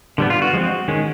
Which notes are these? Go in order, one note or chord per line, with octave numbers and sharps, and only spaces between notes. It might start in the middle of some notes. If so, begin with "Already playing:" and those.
D3 G3 B3
F4
F#4
F3 G#3 C4
D#3 G#3 C#4